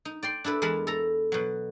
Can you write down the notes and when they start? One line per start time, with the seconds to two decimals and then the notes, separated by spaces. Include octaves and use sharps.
0.05 D#4
0.23 D5 G5 C6
0.44 D4 E4 A4 B4
0.62 E2 G#3 A#4 B4 A5 B5
0.87 A4 A#5
1.32 B2 F#3